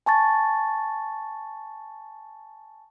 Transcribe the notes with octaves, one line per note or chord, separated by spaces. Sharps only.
G#5 A5 C#6 A6